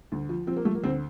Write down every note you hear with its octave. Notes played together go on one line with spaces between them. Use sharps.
D2
F3
F3 C4
A#3
F3 A3
A#3
D2 C4